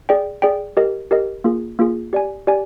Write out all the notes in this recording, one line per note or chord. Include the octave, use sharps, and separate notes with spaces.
G#4 D5 G5
G#4 D5 G5
G4 A#4 D#5
G4 A#4 D#5
A#3 F4 G#4
A#3 F4 G#4
G4 D5 G#5
G4 D5 G#5